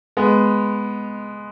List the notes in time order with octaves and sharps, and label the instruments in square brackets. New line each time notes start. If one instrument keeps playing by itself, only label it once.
[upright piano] G#3 B3